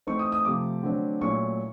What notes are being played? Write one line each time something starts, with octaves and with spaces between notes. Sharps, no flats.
E3 A3 C4 D#4 C#6
D#6
D#6
C3 F3 A3 D6
D3 F#3 A3 C4
A#2 F#3 A3 C#4 E4 C#6